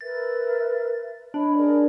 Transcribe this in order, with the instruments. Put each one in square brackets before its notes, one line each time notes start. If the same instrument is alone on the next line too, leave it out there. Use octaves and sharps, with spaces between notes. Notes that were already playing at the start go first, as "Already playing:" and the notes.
[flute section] A#4 B4 E5 [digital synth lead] A6
[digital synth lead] D4 [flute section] C#5 D#5 B5
[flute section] G#4 A#4 D5